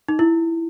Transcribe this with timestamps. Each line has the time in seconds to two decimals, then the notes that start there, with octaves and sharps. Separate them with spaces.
0.08 D#4
0.19 E4